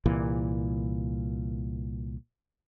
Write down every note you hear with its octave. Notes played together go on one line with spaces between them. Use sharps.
C2 A#2 E3